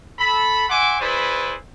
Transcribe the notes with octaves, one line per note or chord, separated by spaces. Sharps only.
A4 B5
E5 F#5 G#5 C6 D6
E4 G#4 B4 C5 D5